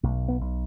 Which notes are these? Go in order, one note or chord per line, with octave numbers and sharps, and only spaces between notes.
B1 A3
B3
B1